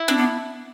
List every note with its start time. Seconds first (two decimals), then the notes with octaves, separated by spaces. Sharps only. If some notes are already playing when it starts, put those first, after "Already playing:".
Already playing: E4
0.08 C4 D4
0.17 B3